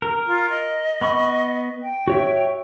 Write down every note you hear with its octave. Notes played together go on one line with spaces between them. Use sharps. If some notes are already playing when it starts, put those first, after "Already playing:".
A#4
F4
D#5
B3 B5 C#6
G5
F#4 C#5 E5